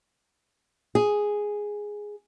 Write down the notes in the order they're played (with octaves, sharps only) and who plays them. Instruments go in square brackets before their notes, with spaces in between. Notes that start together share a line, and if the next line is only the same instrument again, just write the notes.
[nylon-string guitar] G#4